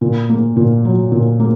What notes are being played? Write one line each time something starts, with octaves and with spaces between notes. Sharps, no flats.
A#2
A#3
A#2
F#3
A#2
A#3